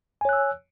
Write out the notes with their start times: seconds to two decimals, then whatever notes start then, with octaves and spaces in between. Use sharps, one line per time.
0.21 G#5
0.25 C#5
0.29 F#6
0.33 E6